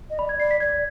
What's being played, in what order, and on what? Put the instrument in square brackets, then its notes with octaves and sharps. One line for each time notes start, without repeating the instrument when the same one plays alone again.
[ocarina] D#5
[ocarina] D5 [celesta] B5
[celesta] G#6
[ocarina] D5 [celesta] C7
[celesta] B6
[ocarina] D5 [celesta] G#6